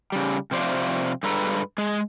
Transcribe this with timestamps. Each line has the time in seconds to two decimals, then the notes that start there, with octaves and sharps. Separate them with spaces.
0.12 C#3 G3
0.51 C3 F3 C5 D5 E5 F5
1.23 G2 G#3 A4 B4 A#5
1.78 G#3 G#4